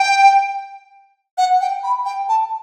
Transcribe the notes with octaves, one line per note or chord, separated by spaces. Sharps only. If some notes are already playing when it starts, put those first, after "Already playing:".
Already playing: G5
F#5
G5
B5
G5
A5